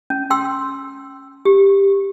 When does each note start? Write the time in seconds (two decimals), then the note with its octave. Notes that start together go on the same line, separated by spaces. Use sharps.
0.10 C#4
0.30 G5 C6 E6
1.45 G4